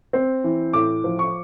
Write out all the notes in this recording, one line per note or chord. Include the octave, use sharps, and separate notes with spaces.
C4
E3
A2 D6
F3
C#6